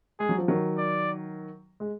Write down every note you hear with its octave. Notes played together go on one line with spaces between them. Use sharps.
G#3 G#4
F#3
F3
D#3 F#3
D5
G#3